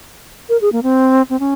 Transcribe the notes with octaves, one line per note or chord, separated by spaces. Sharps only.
A#4
G#4
A#3
C4
C4
C#4